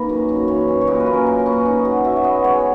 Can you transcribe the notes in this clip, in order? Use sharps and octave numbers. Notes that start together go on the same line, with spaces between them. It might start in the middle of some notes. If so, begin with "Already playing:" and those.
Already playing: D#3 A#3 B4
F#2
F#2
E3 C#5
F#2
C#5
A#2 D#5
B4
C#4
A#4
A#2 A#4
B4
C#4
B4
D#4
F#3
F#3 E5
E5
B3 D#5
G#3 C#5